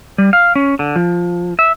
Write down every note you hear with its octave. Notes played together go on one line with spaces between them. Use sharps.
G3
F5
C#4
D3
F3
E5